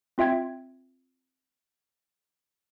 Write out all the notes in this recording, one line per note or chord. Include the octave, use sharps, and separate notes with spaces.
C4 F4 E5 G5 G#6